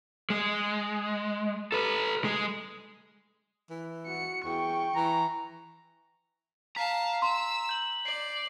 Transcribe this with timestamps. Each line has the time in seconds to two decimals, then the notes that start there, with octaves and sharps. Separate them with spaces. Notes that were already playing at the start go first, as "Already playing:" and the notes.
0.30 G#3
1.72 A4 B4
2.24 G#3
3.70 E3
4.08 F#4 C#7
4.45 E2 G5 C#6
4.95 E3 A#5
6.76 F5 A5 A#5 B6
7.22 C6 E6
7.69 G6 F#7
8.06 D5 C7